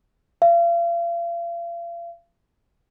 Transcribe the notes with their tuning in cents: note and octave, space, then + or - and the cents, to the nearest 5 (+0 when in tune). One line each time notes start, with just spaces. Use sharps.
F5 -40